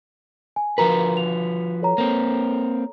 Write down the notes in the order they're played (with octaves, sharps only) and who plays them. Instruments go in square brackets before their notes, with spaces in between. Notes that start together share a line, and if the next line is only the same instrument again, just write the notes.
[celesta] G#5
[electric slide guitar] F3 F#4 B4 [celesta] A#4 A#5
[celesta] F7
A4 C#5 A#5
[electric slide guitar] A#3 C4